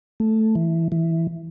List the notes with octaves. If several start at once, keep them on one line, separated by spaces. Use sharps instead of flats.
A3
E3
E3